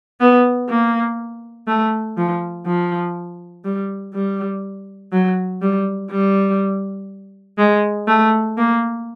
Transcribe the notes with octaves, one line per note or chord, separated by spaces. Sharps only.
B3
A#3
A3
F3
F3
G3
G3
F#3
G3
G3
G#3
A3
A#3